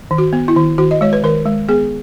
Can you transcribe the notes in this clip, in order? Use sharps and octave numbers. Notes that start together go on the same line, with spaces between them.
D#3
F#4
B3
E4
D#3
D#3 F#4
D#5
G#3 C#5
B4
D#3 A#4
G#3
B3 G#4